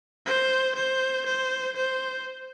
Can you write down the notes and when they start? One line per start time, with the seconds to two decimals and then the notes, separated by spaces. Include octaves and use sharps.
0.26 C5
0.76 C5
1.26 C5
1.76 C5